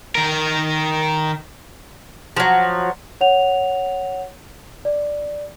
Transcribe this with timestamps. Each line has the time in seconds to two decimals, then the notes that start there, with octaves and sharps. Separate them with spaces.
0.15 D#3 A#4
2.36 F3 F#3
3.21 C#5 F#5 F7
4.85 D5